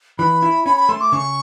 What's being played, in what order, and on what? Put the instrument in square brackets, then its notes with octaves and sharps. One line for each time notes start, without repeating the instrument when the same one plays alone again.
[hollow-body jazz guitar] E3 [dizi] B5
[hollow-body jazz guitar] E4
[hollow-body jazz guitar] C#4 [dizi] B5
[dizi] B5
[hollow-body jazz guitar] A3 [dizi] C6
[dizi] D6
[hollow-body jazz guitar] C#3 [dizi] C#6